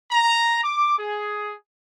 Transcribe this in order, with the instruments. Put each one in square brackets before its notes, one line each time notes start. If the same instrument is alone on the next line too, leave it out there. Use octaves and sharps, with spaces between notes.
[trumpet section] A#5
D6
G#4